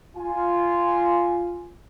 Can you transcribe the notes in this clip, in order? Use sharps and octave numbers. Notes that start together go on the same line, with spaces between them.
F4 G#5